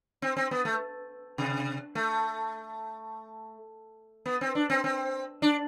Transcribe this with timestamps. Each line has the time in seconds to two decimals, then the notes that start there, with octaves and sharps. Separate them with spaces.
0.22 C4
0.37 C4
0.51 B3
0.65 A3
1.38 C3
1.95 A3
4.26 B3
4.41 C4
4.55 D4
4.70 C4
4.84 C4
5.42 D4